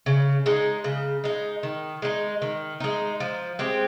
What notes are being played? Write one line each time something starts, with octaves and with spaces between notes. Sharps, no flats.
C#3
G#3 D#4
C#3
G#3 D#4
D#3
G#3 D#4
D#3
G#3 D#4
F3
G#3 C4 G4